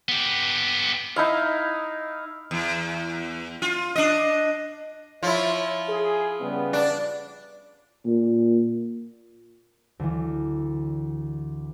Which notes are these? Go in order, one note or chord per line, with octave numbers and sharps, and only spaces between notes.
B3 G4
D#4 E4 F5
E2
F4
D4 D#5
F3 E4 C#5
G#4
C#3 G3 B3
D4
A#2
D2 E3